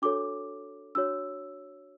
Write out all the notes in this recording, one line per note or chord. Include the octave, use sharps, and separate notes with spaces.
D4 F#4 A4 C#5 D6
D4 F#4 C#5 E6